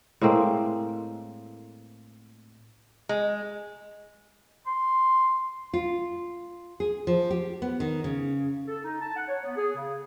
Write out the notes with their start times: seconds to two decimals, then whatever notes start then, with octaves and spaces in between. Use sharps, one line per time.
0.21 A2 G#3 A#3 C4
3.09 G#3
4.66 C6
5.74 F4
6.80 G#4
7.07 F3
7.31 G4
7.62 B3
7.80 D#3
8.04 C#3
8.67 A4
8.84 D#4
9.01 A5
9.16 F#5
9.28 C#5
9.43 B3
9.56 G#4
9.75 C#3